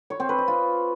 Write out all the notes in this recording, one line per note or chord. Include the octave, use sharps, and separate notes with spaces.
C#5
C4
B4
D#5
F4